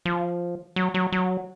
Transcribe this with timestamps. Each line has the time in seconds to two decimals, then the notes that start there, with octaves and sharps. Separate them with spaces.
0.05 F3
0.76 F#3
0.94 F#3
1.12 F#3